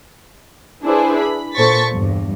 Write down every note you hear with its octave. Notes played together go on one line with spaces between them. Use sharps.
D4 E4 G#4 B4 C5
B5
A#2 A4 C5 C#6 A6 B6
E2 G2